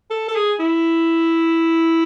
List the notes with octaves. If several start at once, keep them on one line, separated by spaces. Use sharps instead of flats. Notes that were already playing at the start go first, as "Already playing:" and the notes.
A4
A4
G#4
E4